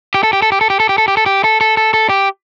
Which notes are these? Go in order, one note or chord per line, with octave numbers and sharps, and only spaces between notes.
G4
A4
G4
A4
G4
A4
G4
A4
G4
A4
G4
A4
G4
A4
A4
A4
A4
G4